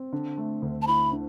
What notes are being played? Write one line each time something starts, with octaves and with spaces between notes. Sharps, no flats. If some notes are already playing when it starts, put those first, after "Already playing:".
Already playing: C4
D3
A3
D2
A5
E4 B5
D3